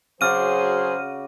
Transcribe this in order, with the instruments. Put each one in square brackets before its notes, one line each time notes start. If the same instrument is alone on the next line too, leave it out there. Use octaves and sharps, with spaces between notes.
[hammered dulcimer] C#3 F#4 D5 [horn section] F#3 G#4 [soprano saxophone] C5 [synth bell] F6 D#7